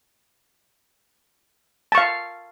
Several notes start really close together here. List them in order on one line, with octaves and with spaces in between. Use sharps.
A5 C#6 F5